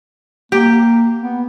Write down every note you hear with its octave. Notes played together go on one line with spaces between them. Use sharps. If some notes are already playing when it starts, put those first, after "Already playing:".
A#3 G4
B3